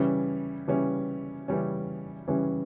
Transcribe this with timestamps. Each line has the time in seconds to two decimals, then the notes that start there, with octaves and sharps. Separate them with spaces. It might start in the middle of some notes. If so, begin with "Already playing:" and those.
Already playing: C#3 E3 G3 C#4
0.68 C#3 E3 G3 C#4
1.48 C#3 E3 G3 C#4
2.28 C#3 E3 G3 C#4